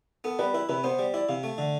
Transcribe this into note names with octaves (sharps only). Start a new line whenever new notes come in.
B3 A4
G3 B4
E4 B4
C3 B4
B3 C5
G3
E4 D5
C3 F5
A3
D3